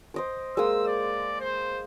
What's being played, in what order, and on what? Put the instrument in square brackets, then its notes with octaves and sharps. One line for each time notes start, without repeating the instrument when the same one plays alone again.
[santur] C5 D#5 D6
[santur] G#3 A#3 D#6 [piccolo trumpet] E6
[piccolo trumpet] D5
C5